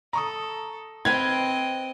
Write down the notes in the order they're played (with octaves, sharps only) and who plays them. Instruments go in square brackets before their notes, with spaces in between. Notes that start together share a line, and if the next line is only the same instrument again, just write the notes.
[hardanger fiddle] A4 [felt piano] A#5 C#6 D#6
[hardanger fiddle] C4 D#5 [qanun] B4 F5 G5 [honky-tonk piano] G#6